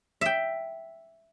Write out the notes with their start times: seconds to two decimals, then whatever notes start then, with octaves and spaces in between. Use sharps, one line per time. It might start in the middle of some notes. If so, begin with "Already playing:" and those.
0.21 E5 G5